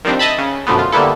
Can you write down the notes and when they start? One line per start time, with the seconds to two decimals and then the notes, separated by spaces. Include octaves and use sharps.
0.05 D#3 F3 G3 C4 D4
0.19 D#5 E5 A5 B5
0.38 C#3
0.67 F#2 B2 D3 F3 A3 B3
0.79 F4
0.92 D3 G3 A#3 B3 E4 A4